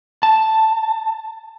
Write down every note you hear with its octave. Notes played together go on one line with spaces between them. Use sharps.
A5